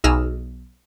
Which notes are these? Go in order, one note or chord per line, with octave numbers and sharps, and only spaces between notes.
B1 D#4 G#4 D#5 E6 F6